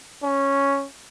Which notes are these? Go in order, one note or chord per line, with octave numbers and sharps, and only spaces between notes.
C#4